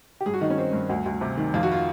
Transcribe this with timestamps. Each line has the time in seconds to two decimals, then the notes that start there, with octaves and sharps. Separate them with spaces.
0.21 G4
0.26 G2 G#4
0.34 F#4
0.41 D#3 D#4
0.50 C#4
0.57 D#3 C4
0.73 G2
0.89 D2
1.06 D2
1.21 C3
1.37 D#3
1.54 F2 F4
1.63 F#4
1.72 F4